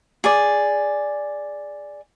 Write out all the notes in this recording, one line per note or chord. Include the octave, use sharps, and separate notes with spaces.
G#4 D5